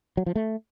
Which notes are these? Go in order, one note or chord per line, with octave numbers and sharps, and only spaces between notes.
F#3
F3
A3